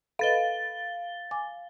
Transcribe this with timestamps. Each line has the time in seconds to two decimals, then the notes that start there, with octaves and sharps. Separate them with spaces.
0.19 A4 B4 D#5 F5 A6 G7
1.31 G#5 D6